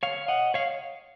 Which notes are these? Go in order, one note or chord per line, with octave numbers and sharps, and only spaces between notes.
C#5 F5
D#5 F#5
C#5 F5